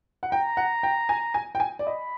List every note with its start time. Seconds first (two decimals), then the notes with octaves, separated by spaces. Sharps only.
0.23 F#5
0.32 G5 A#5
0.57 F#5
0.83 G5
1.09 G#5
1.34 G#5
1.55 G5
1.60 G#5
1.79 D5
1.87 D#5 B5